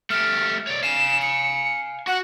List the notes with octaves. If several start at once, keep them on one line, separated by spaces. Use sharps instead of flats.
A3 G4 F6
C#5 D5
F5 G#5 E7
C#7
F#4 F#5